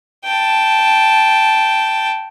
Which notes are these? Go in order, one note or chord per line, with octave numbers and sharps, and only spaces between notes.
G5 A5